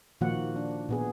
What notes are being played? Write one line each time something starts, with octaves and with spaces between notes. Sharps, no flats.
A#2 D#3 F3 A#3 F#4 F#5
D4
A#2 B3 G#4